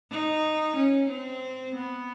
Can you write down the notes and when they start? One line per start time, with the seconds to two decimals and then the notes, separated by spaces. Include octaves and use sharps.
0.12 D#4
0.76 C#4
1.09 C4
1.75 B3